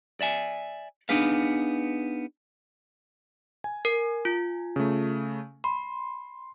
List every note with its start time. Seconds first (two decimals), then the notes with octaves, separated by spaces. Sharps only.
0.21 D5 E5 G#5
1.09 B3 D4 D#4 G#4 B4 F5
3.64 G#5
3.85 A#4
4.25 F4
4.76 C#3 A3
5.64 B5 C6